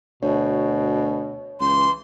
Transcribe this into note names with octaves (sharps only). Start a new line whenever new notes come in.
D2 B2 C#5
C#2 E3 C6